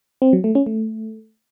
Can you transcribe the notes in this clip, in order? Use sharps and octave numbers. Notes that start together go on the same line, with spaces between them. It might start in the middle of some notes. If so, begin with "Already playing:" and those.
C4
F#3
A3
C#4
A3